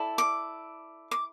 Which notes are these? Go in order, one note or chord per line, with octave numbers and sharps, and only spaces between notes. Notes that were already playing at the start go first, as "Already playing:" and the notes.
Already playing: E4 A4 D5
D6
D6